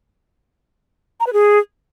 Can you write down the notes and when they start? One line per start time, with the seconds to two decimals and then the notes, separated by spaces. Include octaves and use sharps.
1.20 A#5
1.27 B4
1.33 G#4